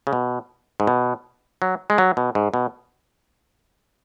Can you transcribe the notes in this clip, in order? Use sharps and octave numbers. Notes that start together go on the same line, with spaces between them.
C#3
B2
G#2
B2
F#3
G#3
F#3
B2
G#2
B2